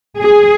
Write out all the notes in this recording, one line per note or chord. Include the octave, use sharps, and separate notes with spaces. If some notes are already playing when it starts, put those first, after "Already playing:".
G#4